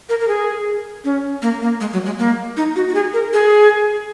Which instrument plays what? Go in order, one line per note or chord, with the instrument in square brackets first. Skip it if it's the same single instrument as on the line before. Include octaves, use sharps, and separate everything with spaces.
[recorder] A#4
A#4
G#4
C#4
A#3
A#3
G#3
F#3
G#3
A#3
D#4
F#4
F#4
G#4
A#4
G#4